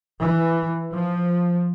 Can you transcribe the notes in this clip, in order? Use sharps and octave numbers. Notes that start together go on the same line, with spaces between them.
E3
F3